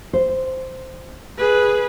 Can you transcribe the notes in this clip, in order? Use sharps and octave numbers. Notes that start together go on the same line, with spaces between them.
C5
G#4 B4